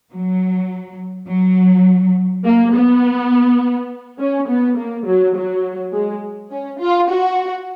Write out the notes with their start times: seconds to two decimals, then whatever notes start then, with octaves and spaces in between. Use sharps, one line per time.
0.12 F#3
1.28 F#3
2.45 A#3
2.74 B3
4.19 C#4
4.48 B3
4.77 A#3
5.06 F#3
5.35 F#3
5.93 G#3
6.51 C#4
6.80 F4
7.09 F#4